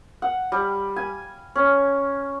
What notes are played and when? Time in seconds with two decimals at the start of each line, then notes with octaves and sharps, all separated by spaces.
0.22 F#5
0.52 G3
0.96 G#5
1.56 C#4